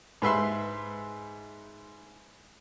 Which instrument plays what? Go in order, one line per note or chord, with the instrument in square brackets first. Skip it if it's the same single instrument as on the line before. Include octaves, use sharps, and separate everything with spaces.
[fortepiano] G#2 B4 E5 C6